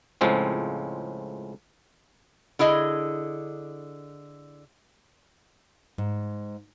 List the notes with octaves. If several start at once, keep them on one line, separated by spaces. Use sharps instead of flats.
C#2 A2 F3 G#3 C4
D3 E4 G#4 D#5
G#2